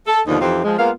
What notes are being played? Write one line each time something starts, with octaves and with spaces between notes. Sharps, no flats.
A4
D#2 B2 D3 F3 D#4
F2 E3 C4 D#4 F4 G4
F3 G#3
G#3 A#3 B3 F4 A#4 F5